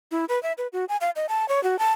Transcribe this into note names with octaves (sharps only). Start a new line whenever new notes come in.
E4
B4
E5
B4
F#4
G#5
F5
D#5
A5
C#5
F#4
A5